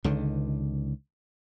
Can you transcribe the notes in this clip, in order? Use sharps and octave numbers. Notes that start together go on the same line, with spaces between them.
C#2 D3 D#3